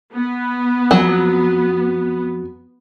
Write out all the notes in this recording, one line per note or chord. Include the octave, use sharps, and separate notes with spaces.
B3
F2 F#3